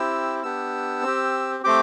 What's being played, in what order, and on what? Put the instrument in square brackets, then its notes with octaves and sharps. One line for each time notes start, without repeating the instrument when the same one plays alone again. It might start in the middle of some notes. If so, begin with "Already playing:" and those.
Already playing: [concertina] C4 E4 G4 E6
B3 D4 G4 E6
C4 G4
A3 C4 G4 D6